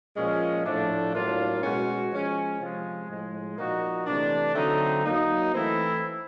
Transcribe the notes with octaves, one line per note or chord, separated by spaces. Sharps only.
A#2 F3 G#3 C#4
A2 F3 A3 D4
A2 F#3 A#3 D4 F4
B2 G#3 C#4 F#4
F3 G#3 C#4
C3 F3 G#3
A2 F3 G#3
A#2 F3 A#3 D#4 F#4
C3 E3 A3 D4
D3 F#3 A3 C4 D#4
F#3 A#3 D#4
E3 A3 C4 E4